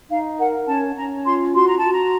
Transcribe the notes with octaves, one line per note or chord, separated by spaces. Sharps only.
D#4 F5
A#4 F#5
C#4 A5
C#4 A#5
F4 C6
F#4 C6
A#5
F#4 A5
A#5